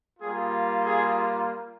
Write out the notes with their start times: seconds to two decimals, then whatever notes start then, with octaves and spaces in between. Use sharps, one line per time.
0.20 G3 A#3 F4 G#4
0.84 G#4